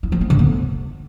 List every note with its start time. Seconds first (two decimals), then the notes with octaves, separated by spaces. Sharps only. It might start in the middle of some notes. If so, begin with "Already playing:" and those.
0.03 E4
0.12 F3
0.21 B3
0.30 D3
0.39 B3